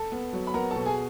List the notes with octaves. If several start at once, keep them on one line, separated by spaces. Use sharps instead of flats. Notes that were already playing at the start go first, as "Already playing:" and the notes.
Already playing: A4 A5
B3
F#3
B5
B3 A#4 A#5
A4 A5
B2
G#4 G#5